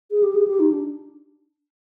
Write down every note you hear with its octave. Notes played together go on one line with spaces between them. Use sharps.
G#4
G4
G#4
G4
D#4
D4